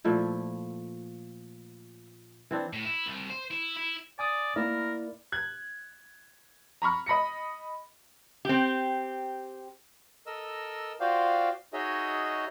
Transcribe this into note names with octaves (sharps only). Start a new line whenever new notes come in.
A#2 F3 A3 E4
E3 C4 D4
A2
E4
C2
C5
E4
E4
D5 G#5 D6 D#6
A#3 E4 A#4 D5
F#6 G#6
A#5 B5 C#6 F6
D#5 B5 A#6 C#7
C4 G4
A4 A#4 D#5 E6
F4 F#4 C5 D5 F5 G5
D#4 F#4 G#4 C#5 D#5 E5